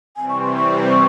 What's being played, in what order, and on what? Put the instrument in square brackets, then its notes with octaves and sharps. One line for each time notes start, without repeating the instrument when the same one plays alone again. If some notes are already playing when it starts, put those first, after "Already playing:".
[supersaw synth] C3 E3 G3 C4 [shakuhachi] G#5
[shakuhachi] C#6
C6
C#6